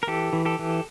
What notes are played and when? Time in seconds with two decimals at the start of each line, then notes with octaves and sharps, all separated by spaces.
0.03 A#4
0.07 E3 G4 A4
0.33 E3
0.45 G4 A4
0.59 E3